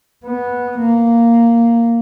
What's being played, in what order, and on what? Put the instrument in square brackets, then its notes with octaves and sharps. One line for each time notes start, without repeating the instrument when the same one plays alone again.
[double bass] B3
A#3